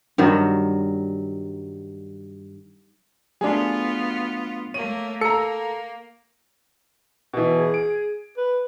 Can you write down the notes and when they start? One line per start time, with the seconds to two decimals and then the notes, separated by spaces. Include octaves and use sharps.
0.18 G2 D#3 F#3
3.41 F#3 A3 B3 D4 F4 G#4
4.74 A3 A#3 C#5 D#7
5.21 A#3 A4 A#5 C#7
7.33 B2 E3
7.57 G#4
7.74 D7
8.38 B4